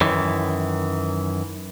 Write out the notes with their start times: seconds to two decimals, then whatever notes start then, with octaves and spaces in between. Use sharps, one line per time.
0.01 F#2 D#3 E3